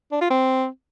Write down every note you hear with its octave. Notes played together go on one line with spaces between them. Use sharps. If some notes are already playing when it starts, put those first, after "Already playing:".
D4
F4
C4